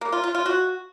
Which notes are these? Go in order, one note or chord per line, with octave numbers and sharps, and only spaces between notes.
A#3
F4
F4
F4
F#4